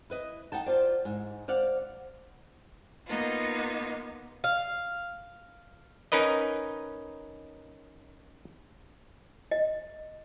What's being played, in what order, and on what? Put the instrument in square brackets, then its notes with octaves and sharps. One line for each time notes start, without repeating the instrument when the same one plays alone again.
[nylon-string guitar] E4 B4 D#5
D#4 F#5 G5 A5
F4 C5 D5
G#2
C5 D5 F5 F#5
[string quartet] A#3 B3 D#4 F4
[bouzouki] F5
[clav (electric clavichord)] C#4 D#4 A#4 B4 D#5
[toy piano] D#5